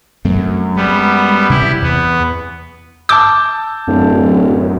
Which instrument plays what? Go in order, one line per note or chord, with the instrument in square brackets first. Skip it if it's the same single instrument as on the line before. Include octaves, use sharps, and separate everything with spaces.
[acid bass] F#2 [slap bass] F#3 A3 C4
[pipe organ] G3 B3 [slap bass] G#3
[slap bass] C3 [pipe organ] E4 G4
[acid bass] E2 [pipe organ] B3
[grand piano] A5 E6 G6 [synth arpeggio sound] D6
[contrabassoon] D1 [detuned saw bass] F#2